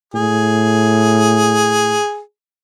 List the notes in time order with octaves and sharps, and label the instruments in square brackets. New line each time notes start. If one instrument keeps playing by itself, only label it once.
[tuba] A2 [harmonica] G#4